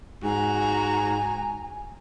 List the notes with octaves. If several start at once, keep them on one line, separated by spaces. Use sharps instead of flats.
G#2 F#4 G#5 A#5